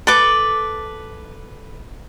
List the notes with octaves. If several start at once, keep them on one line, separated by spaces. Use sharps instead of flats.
A4 B4 D6